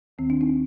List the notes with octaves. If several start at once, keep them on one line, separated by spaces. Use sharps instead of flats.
D#2 D#3 C4
D4
C4 D#4